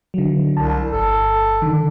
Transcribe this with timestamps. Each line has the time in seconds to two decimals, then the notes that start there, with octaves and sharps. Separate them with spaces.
0.14 D3 F#3
0.57 C2 A5
0.92 G1 A4
1.62 D3 D#3